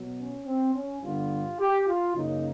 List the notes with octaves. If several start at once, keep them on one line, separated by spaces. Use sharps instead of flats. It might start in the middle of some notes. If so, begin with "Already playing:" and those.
Already playing: B2 F#3 B3
C#4
C4
C#4
G2 D3 G3 B3 F4
G4
F4
F#2 C#3 F#3 A#3 D#4